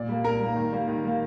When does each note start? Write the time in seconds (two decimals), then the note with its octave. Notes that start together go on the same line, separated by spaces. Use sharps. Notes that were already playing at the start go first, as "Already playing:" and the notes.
Already playing: A#2 D5
0.09 G3 A#3
0.24 A#2 A#4 A#5
0.41 G3 A#3
0.56 D#3
0.72 G3 A#3
0.88 D#3
1.04 G3 A#3